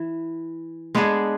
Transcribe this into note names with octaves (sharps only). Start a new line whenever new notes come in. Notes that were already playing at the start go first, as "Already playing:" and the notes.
Already playing: E3 E4
G#3 B3 D4 G#4